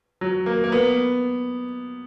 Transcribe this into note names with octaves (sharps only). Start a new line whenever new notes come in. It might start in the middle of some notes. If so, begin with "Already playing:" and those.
F#3
A#3
A#3
B3